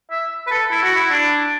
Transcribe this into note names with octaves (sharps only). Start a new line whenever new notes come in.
E5
B4
A4
E4
F#4
E4
D4